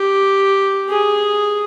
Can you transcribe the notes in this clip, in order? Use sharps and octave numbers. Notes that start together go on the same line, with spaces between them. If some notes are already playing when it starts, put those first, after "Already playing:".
Already playing: G4
G#4